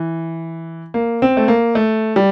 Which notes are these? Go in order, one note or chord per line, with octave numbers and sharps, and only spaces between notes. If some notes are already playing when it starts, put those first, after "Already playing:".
Already playing: E3
A#3
C4
A3
A#3
A3
G3